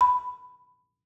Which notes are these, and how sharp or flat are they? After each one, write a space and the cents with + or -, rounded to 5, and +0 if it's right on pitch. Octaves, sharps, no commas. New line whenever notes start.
B5 +10